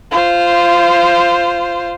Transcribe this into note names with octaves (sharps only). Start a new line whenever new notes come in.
F4 C5